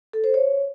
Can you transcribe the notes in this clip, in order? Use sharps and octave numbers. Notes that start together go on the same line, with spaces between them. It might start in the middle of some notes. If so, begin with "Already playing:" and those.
A4
C5
C#5